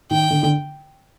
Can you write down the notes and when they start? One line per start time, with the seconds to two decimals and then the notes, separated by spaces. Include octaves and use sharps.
0.11 D#3 G5
0.30 D3
0.43 D3